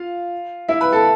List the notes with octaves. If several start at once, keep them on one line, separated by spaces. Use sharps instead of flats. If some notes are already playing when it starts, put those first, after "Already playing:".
Already playing: F4 F5
E4 E5
B4 B5
A4 A5